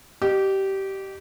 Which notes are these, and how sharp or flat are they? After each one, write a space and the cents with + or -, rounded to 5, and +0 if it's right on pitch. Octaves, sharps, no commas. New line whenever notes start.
G4 -20 D#5 -40